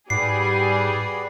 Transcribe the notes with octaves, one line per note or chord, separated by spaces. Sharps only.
G#2 G3 F#4 G#4 B4 D5 C7